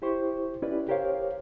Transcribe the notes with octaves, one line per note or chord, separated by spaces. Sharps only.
E4 G4 C5 C#6
C#4 E4 G4 B4 D5
G4 A#4 C5 C#5 F5